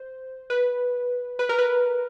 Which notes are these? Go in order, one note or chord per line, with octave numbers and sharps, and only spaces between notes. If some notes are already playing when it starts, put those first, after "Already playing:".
Already playing: C5
B4
B4
A#4
B4